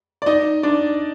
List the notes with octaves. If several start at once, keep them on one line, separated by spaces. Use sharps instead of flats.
D5
D#4 D#5
D4 D5